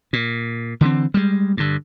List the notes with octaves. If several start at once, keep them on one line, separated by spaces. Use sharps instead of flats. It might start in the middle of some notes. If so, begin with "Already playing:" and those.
A#2
D3 E3 G3 C4
G3 G#3
G2 D3